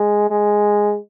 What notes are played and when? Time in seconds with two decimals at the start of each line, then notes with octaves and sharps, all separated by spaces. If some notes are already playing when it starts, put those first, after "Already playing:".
Already playing: G#3
0.30 G#3